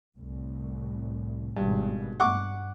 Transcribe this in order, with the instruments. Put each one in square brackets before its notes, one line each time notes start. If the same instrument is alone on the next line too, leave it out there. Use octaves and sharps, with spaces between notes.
[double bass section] C2 A2
[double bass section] G#1 B2 [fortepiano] G2
[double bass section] G2 [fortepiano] F#5 C#6 D6